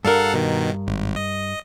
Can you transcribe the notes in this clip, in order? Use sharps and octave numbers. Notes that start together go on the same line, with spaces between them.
G2 A4 A#4 F5 F#5
B2 D#3
G#1
D#5